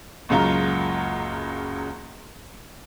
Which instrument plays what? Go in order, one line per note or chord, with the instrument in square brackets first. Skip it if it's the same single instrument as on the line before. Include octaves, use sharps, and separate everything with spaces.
[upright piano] F#1 C#2 C#3 F#3 F4 A#5